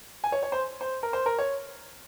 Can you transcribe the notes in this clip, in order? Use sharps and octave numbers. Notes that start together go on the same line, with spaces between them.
G#5
C#5
C#5
C5
C5
A#4
C5
A#4
C#5